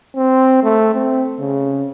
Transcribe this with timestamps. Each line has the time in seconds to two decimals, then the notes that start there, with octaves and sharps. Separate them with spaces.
0.16 C4
0.63 A3
0.94 C4
1.40 C#3